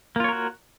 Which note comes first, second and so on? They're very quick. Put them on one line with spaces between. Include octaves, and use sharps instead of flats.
A#3 F4 C#5 A#4 F#4